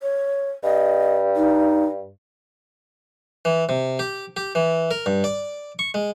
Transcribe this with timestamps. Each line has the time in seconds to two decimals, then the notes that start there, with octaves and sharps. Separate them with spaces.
0.02 C#5
0.64 G2 D#5
1.36 D#4
3.45 E3
3.69 C3
3.99 G4
4.37 G4
4.55 E3
4.91 A#4
5.06 G2
5.24 D5
5.79 C#6
5.94 G#3